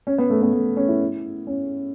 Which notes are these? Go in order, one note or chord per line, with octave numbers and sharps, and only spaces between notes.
C#4
B3
A3
B3
A3
C#4
E4
C#4